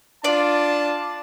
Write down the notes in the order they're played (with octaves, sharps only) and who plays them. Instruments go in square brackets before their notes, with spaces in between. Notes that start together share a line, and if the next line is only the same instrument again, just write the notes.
[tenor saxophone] D4 [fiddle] F4 [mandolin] D5 [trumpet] A5